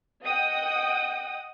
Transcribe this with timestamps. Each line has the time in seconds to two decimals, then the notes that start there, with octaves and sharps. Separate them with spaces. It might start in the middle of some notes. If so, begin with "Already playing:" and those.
0.24 D#5 F#5 G5 D#6